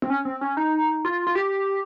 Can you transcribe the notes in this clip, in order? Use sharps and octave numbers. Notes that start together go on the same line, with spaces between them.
C4
C#4
C4
C#4
D#4
F4
F4
G4